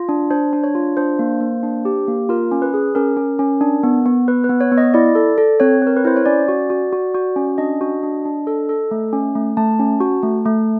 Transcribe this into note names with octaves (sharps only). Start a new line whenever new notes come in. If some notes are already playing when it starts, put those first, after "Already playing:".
Already playing: F4
D4
D4 C5
D4
C#5
F4
D4 C5
A#3
A#3
D4
G4
A#3
F4 A#4
C#4
B4
G#4
C#4 A#4
C#4
C#4
D4
B3
B3
B3 B4
B4
B3
C#5
B3
D#5
E4 D5
A4
A4
C4 C#5
C4 A#4
B4
E4 C5
C#5
C#4 D5
F#4
F#4
F#4
F#4
C#4
D4 D#5
F#4
D4
D4
A4
A4
A3
C#4
A3
A3 A5
C#4
F#4
A3
A3